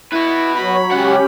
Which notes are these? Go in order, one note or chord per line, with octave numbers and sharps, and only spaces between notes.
E4 F#4 B4
F#3 C#5 B5
C#2 C#4 G4 F#5